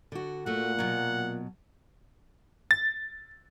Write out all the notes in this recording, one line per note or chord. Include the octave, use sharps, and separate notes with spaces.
D3 F#4
A#2 A3 F#4 F#5
B2 F#3
A6